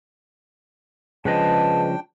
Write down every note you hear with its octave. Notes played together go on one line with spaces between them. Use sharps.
C#3 F3 G#3 D4 B4 D#5 G5 A5